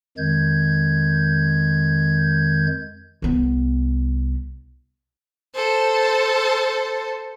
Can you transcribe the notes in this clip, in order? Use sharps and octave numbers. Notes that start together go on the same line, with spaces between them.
F2 D#3 G#3 G6 G#6
C2 B3
A4 C5